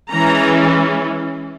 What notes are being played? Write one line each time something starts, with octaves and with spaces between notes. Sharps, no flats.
E3 G#3 C#4 A#5